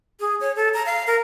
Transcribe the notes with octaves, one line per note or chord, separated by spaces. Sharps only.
G#4
C#5
A4
A#5
F5
A#4